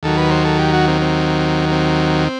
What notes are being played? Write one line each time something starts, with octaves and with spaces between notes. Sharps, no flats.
D#2 D#3 F#3 A4
B4
C5
A4
G4
F#4
C4
C4
C4